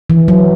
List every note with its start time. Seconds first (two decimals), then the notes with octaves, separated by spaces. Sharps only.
0.10 E3
0.28 F#3